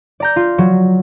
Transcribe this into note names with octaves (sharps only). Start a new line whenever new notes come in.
D5 A#5 G6
F4
F#3